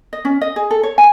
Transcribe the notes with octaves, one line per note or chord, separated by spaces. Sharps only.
D#5
C#4
D#5
G#4
A4
C#5
G#5